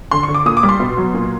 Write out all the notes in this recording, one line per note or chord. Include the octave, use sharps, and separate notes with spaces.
D3 C6
C#6
D3
D6
A#2 D#6
D6
G3
C6
B2
F#3
A#2